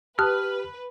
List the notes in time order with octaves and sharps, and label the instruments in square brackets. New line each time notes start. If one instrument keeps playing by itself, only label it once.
[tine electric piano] G4 [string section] B4 [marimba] A5 D#6 F#6 [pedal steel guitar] F6